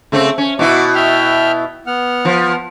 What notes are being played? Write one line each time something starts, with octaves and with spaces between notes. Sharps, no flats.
C#3 A3 C4
C#4
B2 E4 F#4 D6
E5 G5 F6
B3 F#5 F6
F3